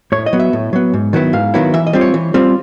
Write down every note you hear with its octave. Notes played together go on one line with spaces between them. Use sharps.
A2 C#5
D#5
F#3 B3
E5
A2
F#3 B3
G#2
D#3 F#3 B3 E4
G#2 F5
D#3 F#3 B3 E4
E3 E5
D#5
G3 C4 F4
C#5
E3
G3 C4 F4